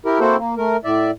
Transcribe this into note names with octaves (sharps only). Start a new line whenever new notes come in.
E4 G4 A#4
A#3 C4 E4 F#4 A4 C5
A#3
A3 A#4
A2 D5 E5